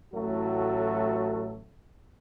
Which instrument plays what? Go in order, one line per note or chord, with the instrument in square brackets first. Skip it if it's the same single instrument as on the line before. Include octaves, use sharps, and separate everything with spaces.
[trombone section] A1 A2 F#3 A3 F#4 A4